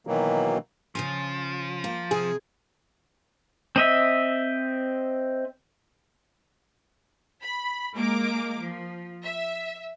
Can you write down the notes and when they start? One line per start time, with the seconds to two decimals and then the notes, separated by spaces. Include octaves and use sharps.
0.07 B2 D#3 E3 F#3 A#3
0.95 C#3 F3 C#4 G#5
1.84 A#3 G5
2.11 C3 C4 G#4
3.76 C4 D#5 E5
7.43 B5
7.95 G#3 A#3 A#4 D6
8.63 F3
9.24 E5